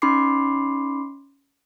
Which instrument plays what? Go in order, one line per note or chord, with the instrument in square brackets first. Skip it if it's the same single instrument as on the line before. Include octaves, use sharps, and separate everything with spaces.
[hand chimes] C#4 D#4 B5 C6 D6 C7